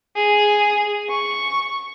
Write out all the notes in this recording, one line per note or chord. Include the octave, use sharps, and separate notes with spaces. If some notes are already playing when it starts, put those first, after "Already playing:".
G#4
C#6